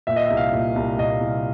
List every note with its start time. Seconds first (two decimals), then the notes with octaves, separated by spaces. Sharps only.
0.07 A#2 E5
0.16 D#5
0.26 E5
0.30 C2
0.37 F5
0.53 A#2
0.76 C2
0.98 A#2 D#5
1.21 C2